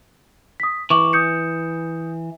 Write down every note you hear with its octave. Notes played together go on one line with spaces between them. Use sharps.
D#6 B6
E3 C#6 D6 F#7
D#6 G6 C#7